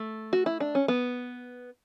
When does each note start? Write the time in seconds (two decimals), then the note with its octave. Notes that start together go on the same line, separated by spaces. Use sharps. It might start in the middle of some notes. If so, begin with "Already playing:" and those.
Already playing: A3
0.33 F#4
0.46 E4
0.60 D4
0.75 C#4
0.88 B3